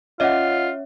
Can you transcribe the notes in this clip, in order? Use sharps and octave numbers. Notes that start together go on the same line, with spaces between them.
C#4 F4 C#5 D#5 E5 F#5